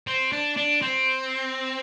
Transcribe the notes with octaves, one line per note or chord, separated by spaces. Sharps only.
C4
D4
D4
C4